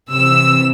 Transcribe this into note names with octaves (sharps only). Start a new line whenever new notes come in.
C3 E3 E6